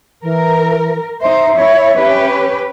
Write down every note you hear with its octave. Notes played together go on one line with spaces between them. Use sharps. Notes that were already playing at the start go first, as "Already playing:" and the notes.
E3 A#4
D#4 C5 E5
E4 C#5
C#4 G4 B4